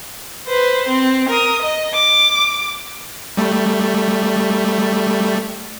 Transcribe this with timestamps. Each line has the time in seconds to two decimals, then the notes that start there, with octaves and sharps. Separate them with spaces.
0.47 B4 C5
0.88 C4
1.29 A#4 D#6
1.62 D#5
1.93 D6
3.37 G3 A3